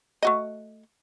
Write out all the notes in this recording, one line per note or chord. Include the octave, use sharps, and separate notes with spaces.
A3 F#4 D#5